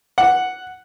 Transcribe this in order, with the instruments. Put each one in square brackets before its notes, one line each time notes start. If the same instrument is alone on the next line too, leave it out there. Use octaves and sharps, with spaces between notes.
[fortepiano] F#5